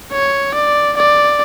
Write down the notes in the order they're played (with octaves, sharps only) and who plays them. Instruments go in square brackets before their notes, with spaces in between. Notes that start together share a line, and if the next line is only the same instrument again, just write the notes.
[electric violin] C#5
D5
D5